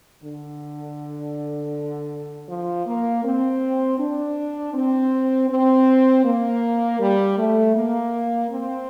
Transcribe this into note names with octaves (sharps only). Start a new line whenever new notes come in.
D3
F3
A#3
C4
D4
C4
C4
A#3
G3
A3
A#3
C4